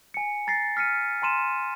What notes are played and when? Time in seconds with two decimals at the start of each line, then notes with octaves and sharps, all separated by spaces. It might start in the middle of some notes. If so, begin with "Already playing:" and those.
0.14 G#5 C#7
0.47 A#5 A6 A#6 C7
0.77 F6 B6 C#7 D#7
1.22 G#5 A#5 C6 D#7 E7